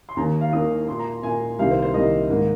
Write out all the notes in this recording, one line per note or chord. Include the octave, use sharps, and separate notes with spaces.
C6
D#2 D#3 A#3 A#5
F5
D#2 D#3 A#3 D#6
A#2 A#3 C6
A#5
A#2 A#3 G#5
C2 C3 D#3 A#3 F5
C5
C5
C2 C3 D#3 A#3 D#5
G#2 D#3 A#3